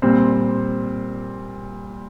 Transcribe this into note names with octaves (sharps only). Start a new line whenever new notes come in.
A#2 G3 C4 C5